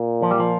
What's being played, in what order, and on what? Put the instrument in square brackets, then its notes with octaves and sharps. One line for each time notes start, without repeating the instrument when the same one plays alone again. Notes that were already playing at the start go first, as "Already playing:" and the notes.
Already playing: [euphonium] A#2
[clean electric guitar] F3
G3
F3